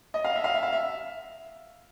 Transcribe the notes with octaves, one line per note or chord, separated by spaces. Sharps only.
D#5
F5
E5
F5
E5
F5
E5